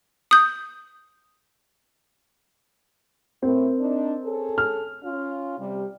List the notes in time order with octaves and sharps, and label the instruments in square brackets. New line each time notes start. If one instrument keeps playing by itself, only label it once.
[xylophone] D#6 G6
[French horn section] A2 E4 [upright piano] C4 A#4
[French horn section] D4 D#4
C#4 G#4 A4
[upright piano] F6
[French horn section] C#4 F4
C3 G3